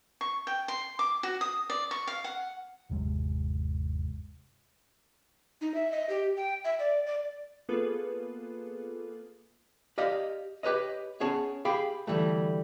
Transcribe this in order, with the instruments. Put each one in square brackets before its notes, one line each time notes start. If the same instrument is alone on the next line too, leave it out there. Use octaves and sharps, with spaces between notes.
[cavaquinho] C#6
G5
C6
D6
F#4
D#6
D5
C#6
F5
F#5
[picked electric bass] G1 D#2 C3 G#3
[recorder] D#4
E5
D#5
G4
G5
E5
D5
D5
[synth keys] A#3 B3 F4 G#4 A4 B4
[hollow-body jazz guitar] G4 D5 D#5 F5
G4 B4 C#5 D#5
B3 C#4 G#4 C#5 A5
G4 G#4 F5 G5 B5
D2 C3 E3 G3 A3